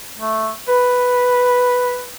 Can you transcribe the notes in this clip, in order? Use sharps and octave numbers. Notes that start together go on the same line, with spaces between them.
A3
B4